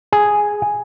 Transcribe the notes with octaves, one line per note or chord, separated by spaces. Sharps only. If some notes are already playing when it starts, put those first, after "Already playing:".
G#4